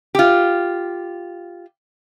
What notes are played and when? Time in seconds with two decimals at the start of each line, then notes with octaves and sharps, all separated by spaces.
0.15 F4 G4